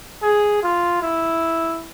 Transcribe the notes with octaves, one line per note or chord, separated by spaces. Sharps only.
G#4
F4
E4